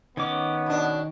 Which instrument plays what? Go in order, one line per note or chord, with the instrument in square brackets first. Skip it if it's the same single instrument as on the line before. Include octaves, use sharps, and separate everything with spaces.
[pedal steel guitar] D#3 D6 [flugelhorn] B3 [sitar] C#4
[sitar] B2 D4